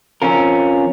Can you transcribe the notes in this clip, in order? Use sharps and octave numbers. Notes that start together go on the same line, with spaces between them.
F3 C4 C#4 F4 A#4